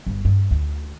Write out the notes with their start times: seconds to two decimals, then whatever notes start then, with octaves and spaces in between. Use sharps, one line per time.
0.06 G1
0.25 G2
0.51 D2